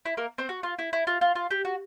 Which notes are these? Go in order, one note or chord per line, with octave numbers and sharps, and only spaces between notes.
E4
A#3 A#4
C4 C5
F#4
F4
E4
E4
F4
F4
F4
G4
F#4